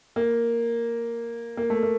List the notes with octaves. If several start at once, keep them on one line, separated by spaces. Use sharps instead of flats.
A#3
A#3
A3
A#3